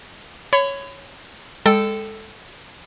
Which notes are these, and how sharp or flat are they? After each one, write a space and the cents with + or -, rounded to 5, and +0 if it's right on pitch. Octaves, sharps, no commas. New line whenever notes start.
C#5 +0 B5 +35
G#3 -25 A4 +0 G5 -10